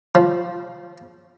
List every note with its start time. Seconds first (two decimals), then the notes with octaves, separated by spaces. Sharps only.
0.15 F3